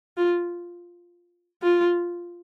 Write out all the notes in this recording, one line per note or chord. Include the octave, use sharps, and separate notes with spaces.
F4
F4